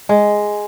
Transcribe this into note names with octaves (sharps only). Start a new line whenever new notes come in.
G#3